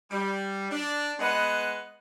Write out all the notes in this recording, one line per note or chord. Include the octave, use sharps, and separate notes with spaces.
G3
D4
G#3 B3 B4 D#5 F#5